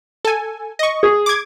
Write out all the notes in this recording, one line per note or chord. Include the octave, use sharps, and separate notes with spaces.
A4 G#5
D#5 C#6
G#4
D6 G#6